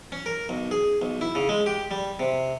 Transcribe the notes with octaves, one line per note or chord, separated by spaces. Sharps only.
C#4
A#4
B1
G#4
B1
E4
C#3
G#3
G4
G3
C3